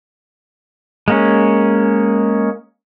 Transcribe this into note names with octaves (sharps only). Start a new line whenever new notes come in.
G#3 A#3 C#4